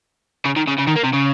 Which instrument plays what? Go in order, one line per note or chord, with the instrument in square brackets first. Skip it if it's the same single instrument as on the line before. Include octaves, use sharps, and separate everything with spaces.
[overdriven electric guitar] C#3
D#3
C#3
C#3
D#3
A#3
C3
C#3